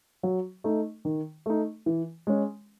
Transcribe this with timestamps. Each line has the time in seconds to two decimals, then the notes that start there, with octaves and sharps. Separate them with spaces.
0.23 F#3
0.64 A3 D#4
1.05 D#3
1.46 A3 D#4
1.86 E3
2.27 G#3 C#4